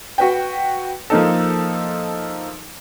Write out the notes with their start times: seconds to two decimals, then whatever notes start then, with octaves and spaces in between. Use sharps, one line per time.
0.18 F#4 B4 G5
1.10 F3 A#3 D#4 A4